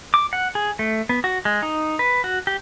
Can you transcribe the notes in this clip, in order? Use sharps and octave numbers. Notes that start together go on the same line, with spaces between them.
D6
F#5
G#4
A3
B3
F#4
G#3
D#4
B4
F#4
G4